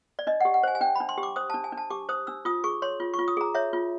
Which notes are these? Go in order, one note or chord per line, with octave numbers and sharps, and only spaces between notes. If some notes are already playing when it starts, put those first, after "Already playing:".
D5
D4 D#5
G4 F#5
F#5
C5 G#5
G#5
D4 G5
D4 B5
C6
G4
D6
C5 D#6
D4 A5
G#5
D4
A5
G4 D6
C5 D#6
D4 E6
F4 D#6
G#4 C#6
C#5 C6
F4
C#6
F4
D#6
G#4 A#5
C#5 E5
F4